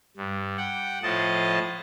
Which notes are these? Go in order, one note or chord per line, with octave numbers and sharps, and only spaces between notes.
G2
F#5 G5
A2 F3 D#5 A5